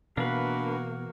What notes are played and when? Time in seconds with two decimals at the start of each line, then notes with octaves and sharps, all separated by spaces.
0.17 B2 E3 A#3 D4 F#4 A#4 B4 F5